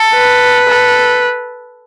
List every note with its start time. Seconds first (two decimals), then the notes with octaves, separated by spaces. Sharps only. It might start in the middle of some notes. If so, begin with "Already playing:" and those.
Already playing: A4
0.14 B4
0.67 A4